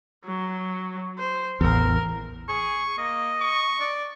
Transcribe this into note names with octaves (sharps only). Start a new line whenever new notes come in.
F#3
C5
A1 E2 A#4
G#4 C#6
A#3 D#5
C#6
D5